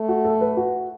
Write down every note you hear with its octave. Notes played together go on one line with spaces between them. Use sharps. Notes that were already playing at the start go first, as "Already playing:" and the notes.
Already playing: A3
F#4
A4
B4
F#4